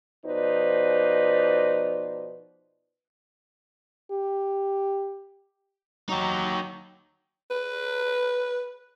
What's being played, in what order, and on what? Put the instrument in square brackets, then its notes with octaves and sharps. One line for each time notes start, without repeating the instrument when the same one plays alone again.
[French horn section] B2 F3 D#4 B4 C5 D5
[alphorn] G4
[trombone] F#3 [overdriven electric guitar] D#4 G4
[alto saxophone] B4